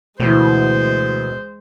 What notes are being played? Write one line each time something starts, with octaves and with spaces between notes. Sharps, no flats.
D2 B2 E3 G#3 C5